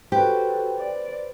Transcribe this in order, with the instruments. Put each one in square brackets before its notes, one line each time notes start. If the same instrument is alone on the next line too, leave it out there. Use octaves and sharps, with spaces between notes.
[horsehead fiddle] F#4 A4 [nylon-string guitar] G4 [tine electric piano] B4 C5
[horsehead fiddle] D5